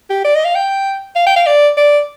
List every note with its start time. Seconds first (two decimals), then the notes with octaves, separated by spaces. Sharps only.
0.10 G4
0.25 D5
0.35 D#5
0.45 F5
0.55 G5
1.16 F5
1.27 G5
1.36 F5
1.46 D5
1.77 D5